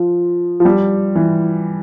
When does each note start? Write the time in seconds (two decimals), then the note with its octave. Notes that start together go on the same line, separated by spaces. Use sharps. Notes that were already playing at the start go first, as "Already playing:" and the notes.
Already playing: F3
0.60 F3
0.65 G3
1.16 E3